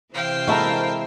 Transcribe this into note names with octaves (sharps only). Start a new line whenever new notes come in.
C3 E3 C5 F5 G5
G#3 E4 F#4 A4 A#4